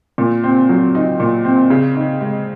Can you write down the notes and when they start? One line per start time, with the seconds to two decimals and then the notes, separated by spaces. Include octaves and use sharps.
0.18 A#2
0.44 C4
0.69 F#3
0.95 D#4
1.20 A#2
1.45 C4
1.70 C#3
1.95 D#4
2.21 G#3